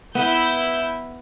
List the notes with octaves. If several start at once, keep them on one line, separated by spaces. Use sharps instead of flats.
B3 E4 B4 G6